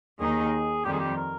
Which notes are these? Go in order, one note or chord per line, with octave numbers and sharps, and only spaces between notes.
D#2 D#3 A#3 D#4 G#4
F2 D#3 G3 G4
G#4
G4
A#4